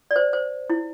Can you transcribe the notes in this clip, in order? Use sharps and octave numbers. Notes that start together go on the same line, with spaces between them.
D5
C5
C5
E4